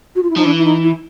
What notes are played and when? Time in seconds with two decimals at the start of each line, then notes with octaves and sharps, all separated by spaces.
0.16 F#4
0.23 F4
0.30 E4
0.36 F3 D#4
0.45 E3 D4
0.58 E4
0.65 D#4
0.83 E4